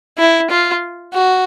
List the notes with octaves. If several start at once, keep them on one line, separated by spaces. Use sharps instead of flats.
E4
F4
F#4